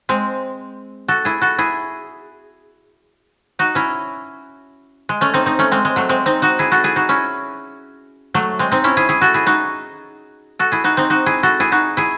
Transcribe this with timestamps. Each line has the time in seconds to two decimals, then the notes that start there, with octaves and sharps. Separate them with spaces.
0.09 G#3 C4
1.08 F#4 A4
1.25 E4 G#4
1.42 F#4 A4
1.58 E4 G#4
3.59 D#4 F#4
3.75 C#4 E4
5.09 G#3
5.21 A3 C#4
5.34 C4 D#4
5.46 C4 D#4
5.59 A3 C#4
5.72 G#3 C4
5.85 G#3
5.96 F#3 A3
6.09 G#3 C4
6.26 C4 D#4
6.42 D#4 F#4
6.59 E4 G#4
6.72 F#4 A4
6.84 E4 G#4
6.96 D#4 F#4
7.09 C#4 E4
8.34 F#3 A3
8.59 G#3 C4
8.71 C4 D#4
8.84 C#4 E4
8.97 E4 G#4
9.09 E4 G#4
9.21 F#4 A4
9.34 E4 G#4
9.47 D#4 F#4
10.59 F#4 A4
10.72 E4 G#4
10.84 D#4 F#4
10.97 C4 D#4
11.10 D#4 F#4
11.26 E4 G#4
11.43 F#4 A4
11.60 E4 G#4
11.72 D#4 F#4
11.97 E4 G#4